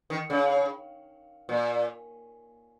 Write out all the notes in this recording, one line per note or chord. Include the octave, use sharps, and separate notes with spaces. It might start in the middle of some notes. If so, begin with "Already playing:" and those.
D#3
C#3
A#2